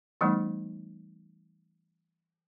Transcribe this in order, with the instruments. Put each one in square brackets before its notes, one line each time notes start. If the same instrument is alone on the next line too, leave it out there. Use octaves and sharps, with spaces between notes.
[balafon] E3 G3 A3 B3 D#4